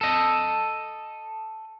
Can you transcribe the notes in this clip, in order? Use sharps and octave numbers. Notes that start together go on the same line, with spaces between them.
A4 D#5